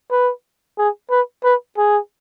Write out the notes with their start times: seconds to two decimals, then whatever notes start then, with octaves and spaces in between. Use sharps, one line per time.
0.11 B4
0.79 G#4
1.11 B4
1.45 B4
1.78 G#4